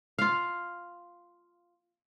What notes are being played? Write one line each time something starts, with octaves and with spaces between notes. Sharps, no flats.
F4 F5